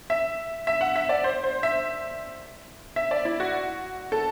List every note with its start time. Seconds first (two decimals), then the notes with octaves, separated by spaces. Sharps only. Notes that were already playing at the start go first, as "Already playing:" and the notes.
0.10 E5
0.67 E5
0.81 F#5
0.96 E5
1.09 D5
1.24 C5
1.44 C5
1.63 E5
2.96 E5
3.11 D5
3.25 E4
3.40 F#4
4.12 A4